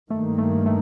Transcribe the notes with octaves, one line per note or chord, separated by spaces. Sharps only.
G2 D#3 A3 A#3
A3
A3